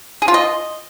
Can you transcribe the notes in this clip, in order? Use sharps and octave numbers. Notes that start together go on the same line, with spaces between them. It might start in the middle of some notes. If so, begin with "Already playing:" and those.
G#4
F4
D#5